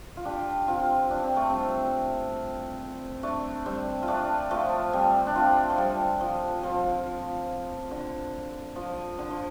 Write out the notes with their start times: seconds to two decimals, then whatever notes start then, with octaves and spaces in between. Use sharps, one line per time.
0.17 F4
0.25 D4 G4
0.68 C4 F4
1.11 D4
1.24 C4
1.36 A3
1.50 G3 C4
3.23 A3 D4
3.66 G3 C4
4.02 F4
4.08 A3 D4
4.51 F3 A3
4.93 G3 C4
5.27 D4
5.35 C4 F4
5.70 F3
5.78 G3
6.21 F3
6.63 F3
7.91 D3
8.76 F3
9.19 D3
9.31 F3